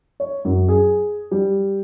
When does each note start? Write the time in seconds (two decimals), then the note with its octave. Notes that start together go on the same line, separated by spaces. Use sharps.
0.20 C#5
0.45 F#2
0.68 G#4
1.31 G3